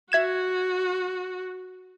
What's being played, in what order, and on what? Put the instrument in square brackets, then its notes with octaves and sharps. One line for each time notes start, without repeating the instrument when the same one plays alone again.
[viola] F#4 [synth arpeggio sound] E5 G#6 E7